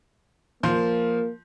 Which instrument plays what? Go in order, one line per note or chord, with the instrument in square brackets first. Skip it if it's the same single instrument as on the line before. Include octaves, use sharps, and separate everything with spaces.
[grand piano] F3 C6 G6 [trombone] A#3